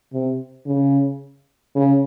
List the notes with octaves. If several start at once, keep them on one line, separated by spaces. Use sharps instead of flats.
C3
C#3
C#3